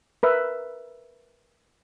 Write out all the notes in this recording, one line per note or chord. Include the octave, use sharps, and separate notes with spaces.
A#4 B4 E5